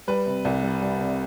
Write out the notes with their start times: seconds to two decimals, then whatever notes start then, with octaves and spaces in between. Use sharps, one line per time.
0.08 G3 B4
0.26 C3
0.45 C2
0.63 G3
0.81 G3
1.00 C3